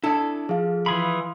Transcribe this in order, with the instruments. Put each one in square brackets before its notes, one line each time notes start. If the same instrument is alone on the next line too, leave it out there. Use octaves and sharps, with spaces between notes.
[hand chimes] D4 [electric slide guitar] E4 D5 [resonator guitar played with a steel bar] A4
[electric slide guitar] F3 [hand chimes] G#4 F5
[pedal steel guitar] E3 G#4 B5 [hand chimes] F5 C6